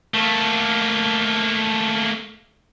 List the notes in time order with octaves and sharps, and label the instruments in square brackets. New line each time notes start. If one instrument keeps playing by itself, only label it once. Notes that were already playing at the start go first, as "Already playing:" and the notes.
[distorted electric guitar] A3 A#3